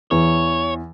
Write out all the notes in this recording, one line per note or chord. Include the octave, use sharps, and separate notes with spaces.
E2 C#5